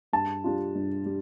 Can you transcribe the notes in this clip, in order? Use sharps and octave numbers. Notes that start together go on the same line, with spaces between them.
G2 A5
G3 D4 F4
G2
G3